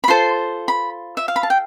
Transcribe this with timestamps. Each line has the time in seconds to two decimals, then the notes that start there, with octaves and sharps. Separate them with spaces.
0.04 B5
0.08 F4 A4 C5 C6
0.68 B5
1.17 E5
1.28 F5
1.36 B5
1.43 A5
1.50 G5